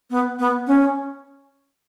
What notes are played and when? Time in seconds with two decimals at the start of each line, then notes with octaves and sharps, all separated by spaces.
0.10 B3
0.39 B3
0.67 C#4